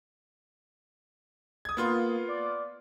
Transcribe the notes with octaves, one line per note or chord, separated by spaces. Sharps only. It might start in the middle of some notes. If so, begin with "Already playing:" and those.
D#6 G#6
A#3 B3 F4 C6
D5